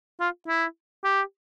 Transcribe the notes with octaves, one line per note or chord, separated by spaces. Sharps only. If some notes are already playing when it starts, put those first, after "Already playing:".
F4
E4
G4